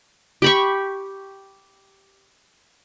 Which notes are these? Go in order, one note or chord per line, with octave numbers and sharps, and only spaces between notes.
G4 B5 C#6